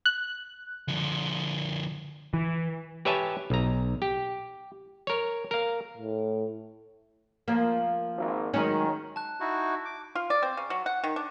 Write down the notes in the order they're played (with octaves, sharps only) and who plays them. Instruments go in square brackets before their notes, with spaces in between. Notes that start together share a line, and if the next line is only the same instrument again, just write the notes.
[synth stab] F#6
[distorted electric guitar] D3 F3
[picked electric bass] E3
[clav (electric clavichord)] G4 B4 C#5 E5 G#5 A5
B1 A#5
G4
A#4 C#5
A#4 F5
[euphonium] A2
[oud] F3 A#3
[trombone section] G#1
[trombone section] D#3 [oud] F#3 G#3 C#4
[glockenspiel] A5 F#6
[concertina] D#4 E4 F#4
D6
[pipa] F4
D5
C4
C#3
F#3
F#5
D#3
D4